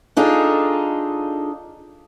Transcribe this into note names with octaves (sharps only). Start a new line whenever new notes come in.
D4 D#4 F4 G#4 A4